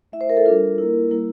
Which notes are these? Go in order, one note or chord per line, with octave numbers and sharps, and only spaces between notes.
A3 E4 E5
C5
A#4
A4
G3 D4 F4 A#4
A#3 E4
G3 A#3 E4